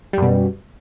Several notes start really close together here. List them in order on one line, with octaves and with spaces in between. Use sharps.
G3 F#2 B2